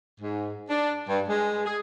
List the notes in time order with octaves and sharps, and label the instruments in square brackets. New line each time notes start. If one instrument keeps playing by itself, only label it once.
[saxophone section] G#2
D4
G2
G#3
G#4